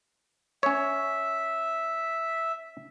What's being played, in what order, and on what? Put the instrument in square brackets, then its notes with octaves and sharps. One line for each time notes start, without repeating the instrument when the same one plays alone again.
[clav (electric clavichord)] C#4 C#5 [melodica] E5